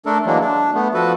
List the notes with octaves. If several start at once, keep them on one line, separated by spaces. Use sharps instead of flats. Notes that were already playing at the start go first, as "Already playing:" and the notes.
A3 D4 A4 A#4
E3 F#3 G#3 A#3 D4
D4
A3 B3
F3 F#4 A4 B4